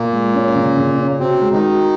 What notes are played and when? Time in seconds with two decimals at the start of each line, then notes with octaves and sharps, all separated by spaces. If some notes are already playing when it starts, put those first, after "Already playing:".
Already playing: A#2 A#3
0.13 G#3
0.34 C#4
0.55 C#3
0.76 C#3
0.98 C#4
1.19 C3 C4 F#4
1.41 G#3
1.52 D#3 D#4
1.63 F#4